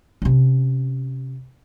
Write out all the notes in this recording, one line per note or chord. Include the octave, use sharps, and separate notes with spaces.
C3 C#4